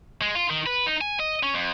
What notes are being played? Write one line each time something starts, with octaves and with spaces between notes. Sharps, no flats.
G#3
F4
D#3
B4
D#4
G#5
D#5
C#4
F2